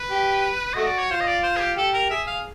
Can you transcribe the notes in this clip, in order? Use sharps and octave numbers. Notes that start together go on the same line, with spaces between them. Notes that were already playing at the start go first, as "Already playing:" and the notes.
Already playing: B4
G4
A3 F#4 D#5
D5
C#5
F4 C5
D#5
D5
C5
G#4
G4
G4 A4
A#4
G#4 E5
F5